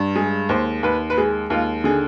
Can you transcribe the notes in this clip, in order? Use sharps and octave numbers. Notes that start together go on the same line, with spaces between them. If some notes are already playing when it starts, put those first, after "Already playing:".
Already playing: G2
G#3 G#4
D#2 C5
D#2 B4
B4
G#3 G#4
D#2 F4
D3 G#4